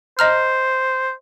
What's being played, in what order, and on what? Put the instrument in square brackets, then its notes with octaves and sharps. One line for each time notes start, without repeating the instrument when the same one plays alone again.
[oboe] C5 [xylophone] D#5 A#5 F6